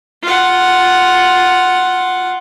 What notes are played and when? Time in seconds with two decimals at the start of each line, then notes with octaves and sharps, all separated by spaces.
0.23 F4 F#5